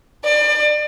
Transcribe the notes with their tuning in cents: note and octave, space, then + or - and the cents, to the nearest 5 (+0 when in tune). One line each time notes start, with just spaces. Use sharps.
D5 +30